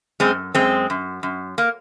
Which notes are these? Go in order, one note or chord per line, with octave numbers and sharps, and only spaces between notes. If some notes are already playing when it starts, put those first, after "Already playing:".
F#2 G#3 C4
F#2 G#3 C4
F#2
F#2
A#3